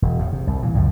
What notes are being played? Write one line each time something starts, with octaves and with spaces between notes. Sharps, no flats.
E1
E2 A2
C3
C2
A#2 E3
C#2 F#2 A2